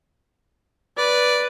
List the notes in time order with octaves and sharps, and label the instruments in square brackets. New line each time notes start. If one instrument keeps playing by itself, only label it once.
[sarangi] B4 [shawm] D5